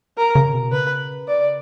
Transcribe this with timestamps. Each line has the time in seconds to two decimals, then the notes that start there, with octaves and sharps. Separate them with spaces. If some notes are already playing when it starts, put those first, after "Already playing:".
0.17 A#4
0.35 C#3
0.54 B2
0.72 C#3 B4
1.28 D5